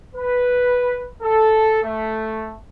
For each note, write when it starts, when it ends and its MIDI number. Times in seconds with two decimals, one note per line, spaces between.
0.15 1.07 71
1.21 1.80 69
1.83 2.53 57